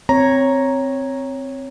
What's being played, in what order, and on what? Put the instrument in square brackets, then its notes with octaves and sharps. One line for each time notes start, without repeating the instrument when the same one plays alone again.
[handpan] C4 C#5 [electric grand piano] A#5